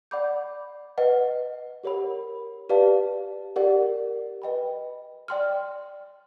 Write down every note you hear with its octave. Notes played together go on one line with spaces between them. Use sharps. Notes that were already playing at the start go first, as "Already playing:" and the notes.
D5 F#5 B5 D6 G6
B4 D#5 F#5
G4 A#4 C#5 F#5 B5
G4 B4 D5 F5 A5
G4 A#4 D5 F#5
B4 D#5 G5 B5
D5 G5 C6 F6